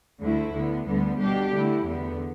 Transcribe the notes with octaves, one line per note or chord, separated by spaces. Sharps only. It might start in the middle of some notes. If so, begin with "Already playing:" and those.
D2 D3 A3 E4
D2 D3 B3
D2 D3 G3 B3
B2 G3 D4 G4
D3 A3 E4
E2 D3 B3